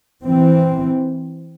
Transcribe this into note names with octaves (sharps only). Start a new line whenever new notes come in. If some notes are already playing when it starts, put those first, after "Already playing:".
E3 C4